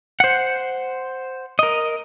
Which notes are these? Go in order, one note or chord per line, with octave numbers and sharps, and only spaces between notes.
C5 F#5
A#4 D#5